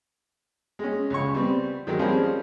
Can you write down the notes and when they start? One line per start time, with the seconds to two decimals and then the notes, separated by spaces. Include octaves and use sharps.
0.79 G#3 C#4
1.10 C#2 C#3 C#6
1.34 G3 B3 C4
1.87 D#3 F#3 G#3
1.99 F3 G3 G#3 A#3 C4 C#4